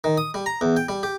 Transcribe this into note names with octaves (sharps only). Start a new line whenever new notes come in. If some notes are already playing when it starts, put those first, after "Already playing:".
D#3
D#6
G3
A#5
E2
G5
G3
G4